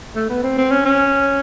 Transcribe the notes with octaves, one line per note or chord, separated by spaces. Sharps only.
A3
B3
C4
C4
C#4
C#4